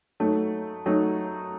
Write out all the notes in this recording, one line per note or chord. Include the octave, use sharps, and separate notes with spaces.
F#3 A3 D#4
F#3 A3 D#4